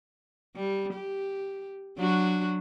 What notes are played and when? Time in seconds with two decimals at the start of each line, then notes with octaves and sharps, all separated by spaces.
0.56 G3
0.94 G4
1.97 F#3 D4 F#4